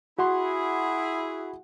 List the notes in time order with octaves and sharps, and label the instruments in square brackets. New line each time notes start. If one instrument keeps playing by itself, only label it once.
[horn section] E4 G#4 [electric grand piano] F#4 F#5 C6